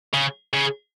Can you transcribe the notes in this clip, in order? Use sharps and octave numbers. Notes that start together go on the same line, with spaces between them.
C#3
C#3